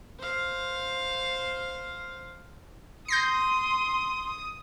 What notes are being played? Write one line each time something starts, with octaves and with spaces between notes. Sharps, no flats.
C5 F5
C6 D#6 G6 A#6 C7